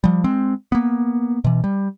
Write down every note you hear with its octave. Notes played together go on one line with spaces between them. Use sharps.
F3 G3
G#3 C4
A#3 B3
B2 E3
G3